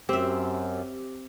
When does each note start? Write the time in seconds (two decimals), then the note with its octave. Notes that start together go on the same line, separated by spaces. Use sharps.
0.09 F#2 C4 G4 E5